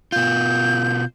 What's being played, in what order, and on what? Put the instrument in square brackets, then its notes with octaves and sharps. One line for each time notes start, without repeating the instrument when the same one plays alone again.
[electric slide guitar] B2 F4 [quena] G6